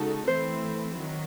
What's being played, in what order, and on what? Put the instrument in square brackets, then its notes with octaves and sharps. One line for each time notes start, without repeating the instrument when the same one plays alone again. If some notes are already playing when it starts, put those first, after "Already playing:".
Already playing: [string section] C#3 G#3 D#4 F#4 A4
[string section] E3 A3 C4 E4 [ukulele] C5
[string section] D#3 F#3